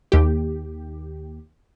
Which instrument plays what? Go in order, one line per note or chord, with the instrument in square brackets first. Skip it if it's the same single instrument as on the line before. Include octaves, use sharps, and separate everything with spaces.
[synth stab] D#2 G4